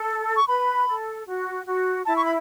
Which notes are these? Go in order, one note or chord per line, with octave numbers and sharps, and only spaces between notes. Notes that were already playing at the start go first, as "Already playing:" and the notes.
Already playing: A4
C#6
B4 B5
A4
F#4
F#4
E4 A5
C#6
B5